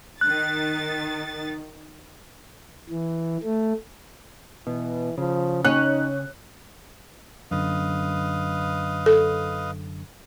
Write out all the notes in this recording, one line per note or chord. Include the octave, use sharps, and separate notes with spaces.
D#3 F#6 A6
E3
A3
B2 E3
C#3 F3
C#4 D#4 F#6
F#2 D3 B4 D#5 F5
A4